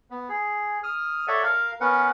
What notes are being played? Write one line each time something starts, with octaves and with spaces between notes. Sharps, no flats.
B3
G#4
D#6 F6
A4 C#5 D5 E5 F#5
A#4 F5
B3 C#4 A#4 B4 F#5